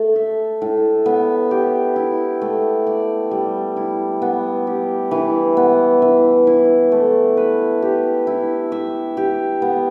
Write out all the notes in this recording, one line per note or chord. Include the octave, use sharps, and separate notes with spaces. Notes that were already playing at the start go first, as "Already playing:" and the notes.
Already playing: A3 A4
E5
A2
B3
G4
E4
A3
D5
G3
E4
B3
G4
E3
B3
E3
E4
A3
B4
G4
E4
E5
G4
B3